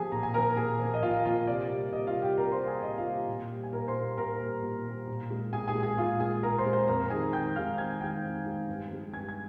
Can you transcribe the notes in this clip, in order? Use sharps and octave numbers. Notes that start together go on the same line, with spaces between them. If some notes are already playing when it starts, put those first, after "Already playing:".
Already playing: F3 A#3 G4 G#4 G#5
A#2 A#5
G#5
F3 A#3 A#4 A#5
A#2 G#4 G#5
F3 A#3
D#5
A#2 F4 F5
F3 A#3 F4 F5
C3 D5
G3 A#3
C3 D#5
F4 F5
G3 A#3
G4 G5
C3 A#4 A#5
C5 C6
G3 A#3
G#4 G#5
C3 D#5
F4 F5
G3 A#3
A#2
G3 A#3
G#5
A#2 A#4 A#5
C5 C6
G3 A#3
A#2 A#4 A#5
G3 A#3
A#2
G3 A#3
A#2
G#3
A#2 G#4 G#5
G#4 G#5
G#3
G#4 G#5
A#2 F4 F5
G#3 G#4 G#5
A#2 A#4 A#5
C5 C6
G#3
C5 C6
F2 A#4 A#5
D#3 G#3 G#4 G#5
F2 G5 G6
D#3 G#3 F5 F6
F2 G#5 G#6
D#3 G#3 G5 G6
F2
D#3 G#3
G2
F3 G#3
G2 G#5 G#6
G#6